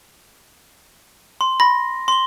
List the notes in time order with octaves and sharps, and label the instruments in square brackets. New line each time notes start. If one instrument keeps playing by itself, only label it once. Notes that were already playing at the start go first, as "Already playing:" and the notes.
[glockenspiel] C6
[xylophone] B5 [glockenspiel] A#6
[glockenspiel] C6 G7